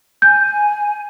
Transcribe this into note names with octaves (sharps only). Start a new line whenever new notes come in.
G#5 G6